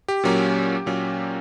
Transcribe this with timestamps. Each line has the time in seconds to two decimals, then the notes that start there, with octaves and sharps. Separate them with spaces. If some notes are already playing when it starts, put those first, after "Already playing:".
0.08 G4
0.24 A#2 F#3 A#3 C#4
0.86 A#2 F#3 A#3 C#4